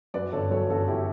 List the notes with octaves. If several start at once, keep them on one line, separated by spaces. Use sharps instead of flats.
F#2 B4 D5
G1 A4 C#5
F#2 A4 C#5
G1 F#4 A4
E4 G4